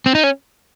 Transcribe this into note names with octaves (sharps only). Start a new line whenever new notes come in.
C4
D#4
C#4